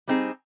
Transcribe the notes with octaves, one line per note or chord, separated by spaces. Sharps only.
G3 C4 D#4 G#4